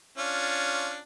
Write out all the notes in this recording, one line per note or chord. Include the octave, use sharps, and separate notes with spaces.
C#4 D4 F4